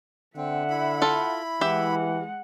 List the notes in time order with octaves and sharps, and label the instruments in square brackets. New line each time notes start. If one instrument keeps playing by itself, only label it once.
[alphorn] D3 [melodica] C4 [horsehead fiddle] E5 F#5
[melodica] E4 B5
[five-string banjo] F4 A4
[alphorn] E3 [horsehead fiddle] G#3 F#5 [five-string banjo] G4 E5